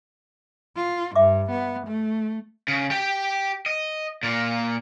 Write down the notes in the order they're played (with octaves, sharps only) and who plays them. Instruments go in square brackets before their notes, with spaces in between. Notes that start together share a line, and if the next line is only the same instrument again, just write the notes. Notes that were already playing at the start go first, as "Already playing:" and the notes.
[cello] F4
[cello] G2 [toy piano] E5 D6
[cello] B3
A3
[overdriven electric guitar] C#3
G4 G5
D#5
A#2 A#3